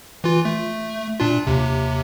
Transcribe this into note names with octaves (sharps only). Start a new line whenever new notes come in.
E3 F4
A3
A#2 D4 F4
D#2 C3